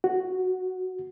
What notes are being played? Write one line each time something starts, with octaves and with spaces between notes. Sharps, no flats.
F#4